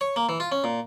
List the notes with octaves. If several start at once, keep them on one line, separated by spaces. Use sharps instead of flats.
C#5
A#3
E3
F4
C#4
A#2